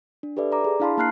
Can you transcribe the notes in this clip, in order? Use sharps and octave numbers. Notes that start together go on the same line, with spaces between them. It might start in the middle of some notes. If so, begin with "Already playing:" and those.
D4
G4 A4 B4 D5 E5
D5 A#5 D6
G#4
D4 E4 F5 A5 B5 C6
A#3 A5 A#5 F6 F#6 C7